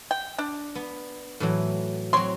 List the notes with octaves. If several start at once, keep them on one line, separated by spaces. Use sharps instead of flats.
G5
D4
B3
A2 E3 F#3
F#3 C4 C#5 C6